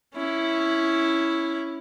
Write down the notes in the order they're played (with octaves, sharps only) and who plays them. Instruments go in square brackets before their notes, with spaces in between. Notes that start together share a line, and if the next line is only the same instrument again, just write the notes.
[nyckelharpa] C#4 E4